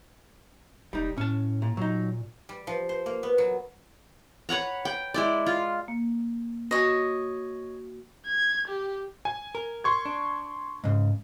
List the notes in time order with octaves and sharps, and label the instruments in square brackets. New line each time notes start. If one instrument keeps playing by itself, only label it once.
[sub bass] E1 [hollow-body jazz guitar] G3 D#4
[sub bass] A2 [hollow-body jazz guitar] C#4 A5
[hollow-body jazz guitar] A#2
[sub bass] A#2 [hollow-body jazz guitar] F#3 D#4
[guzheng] G3
F3
C5
A#3
B3
F#3
[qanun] B4 C#5 F#5 A#5
G5
G#3 E4 D5
F4
[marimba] A#3
[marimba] F#4 G#5 [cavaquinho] C#5 D#5
[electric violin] G#6
G4
[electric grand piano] G#5
[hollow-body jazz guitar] A#4
[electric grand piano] C6 C#6 G#6
[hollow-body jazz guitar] D4
G#2 C#3